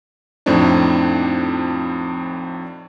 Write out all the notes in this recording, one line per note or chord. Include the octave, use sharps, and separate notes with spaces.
F2 A2 C4 D4 D#4